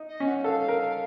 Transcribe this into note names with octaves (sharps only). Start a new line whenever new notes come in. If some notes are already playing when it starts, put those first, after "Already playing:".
Already playing: D#4
D#5
C#4
F#5
F#5
A4 F5
A#4